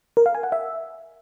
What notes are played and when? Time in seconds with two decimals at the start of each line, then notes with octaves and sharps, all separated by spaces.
0.17 A#4
0.26 F5
0.35 G#5
0.43 F#5
0.52 E5